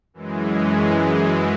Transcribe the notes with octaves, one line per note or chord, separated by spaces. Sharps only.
F#2 E3 G#3